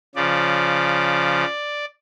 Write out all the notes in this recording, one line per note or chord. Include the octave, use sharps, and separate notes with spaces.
C#3 F3 D5